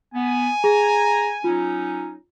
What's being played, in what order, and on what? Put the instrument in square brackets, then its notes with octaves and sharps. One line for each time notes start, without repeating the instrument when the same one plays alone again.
[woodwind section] B3 [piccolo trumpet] G#5
[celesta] G#4 [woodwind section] A#5
[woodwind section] F#3 C#4 D#4 [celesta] F4